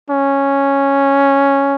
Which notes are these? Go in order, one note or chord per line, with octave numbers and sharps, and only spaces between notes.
C#4